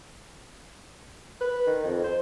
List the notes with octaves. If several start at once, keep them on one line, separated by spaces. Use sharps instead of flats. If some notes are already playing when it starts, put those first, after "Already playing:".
B4
D#3
F2
C5